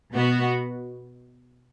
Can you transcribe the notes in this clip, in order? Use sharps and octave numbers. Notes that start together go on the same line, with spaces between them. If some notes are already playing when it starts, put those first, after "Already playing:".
B2 B3 F#4